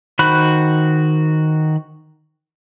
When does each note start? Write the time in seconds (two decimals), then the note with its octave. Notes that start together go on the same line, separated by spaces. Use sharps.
0.19 D#3 F#4 C5 B5 F#6